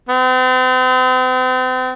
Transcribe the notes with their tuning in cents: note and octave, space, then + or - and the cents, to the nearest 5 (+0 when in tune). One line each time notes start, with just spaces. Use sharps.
C4 -40